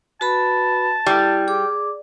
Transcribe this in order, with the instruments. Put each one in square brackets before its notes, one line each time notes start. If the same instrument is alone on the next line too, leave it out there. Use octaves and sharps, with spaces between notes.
[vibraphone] F#4 B4 B5 [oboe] A5
[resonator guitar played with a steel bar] G3 [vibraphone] E4
[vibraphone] G#4 D6